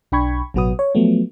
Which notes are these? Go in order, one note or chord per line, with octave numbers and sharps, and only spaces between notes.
B1 D4 G5 B5 C#6 G#6
A1 B2 F#3 F#4 B4 D#6
C#5
F3 F#3 A3 B3